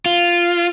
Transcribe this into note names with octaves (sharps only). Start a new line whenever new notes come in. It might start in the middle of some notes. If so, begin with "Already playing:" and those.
F4